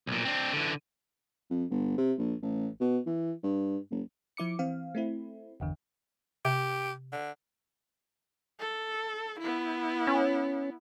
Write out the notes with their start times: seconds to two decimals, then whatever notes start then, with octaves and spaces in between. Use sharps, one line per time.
0.07 B1 A#2
0.25 C4 D4
0.53 D3 E3
1.50 F2
1.70 G1
1.98 C3
2.18 A#1
2.43 A1
2.81 B2
3.07 E3
3.43 G2
3.91 F#1
4.37 F3 E4 D6 C#7
4.59 E3 C4 F5
4.95 A3 C4 E4
5.60 G1 E2 D3
6.45 C3 G4
7.13 D3
8.59 A4
9.40 B3 E4
10.07 C#4